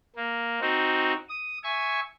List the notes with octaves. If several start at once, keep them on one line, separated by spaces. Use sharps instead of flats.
A#3
C4 D#4 F#4
D#6
E5 G#5 C#6